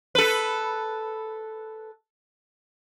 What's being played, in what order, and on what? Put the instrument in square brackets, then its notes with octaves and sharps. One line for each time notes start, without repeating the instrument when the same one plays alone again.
[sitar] A4 B4